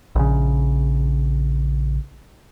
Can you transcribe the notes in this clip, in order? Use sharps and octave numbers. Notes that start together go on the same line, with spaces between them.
A#1 C#3